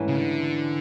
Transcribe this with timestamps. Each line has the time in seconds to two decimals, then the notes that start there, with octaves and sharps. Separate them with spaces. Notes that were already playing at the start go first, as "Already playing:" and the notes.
Already playing: G#2 E3 A3 C#4 E4
0.08 C#3
0.17 D3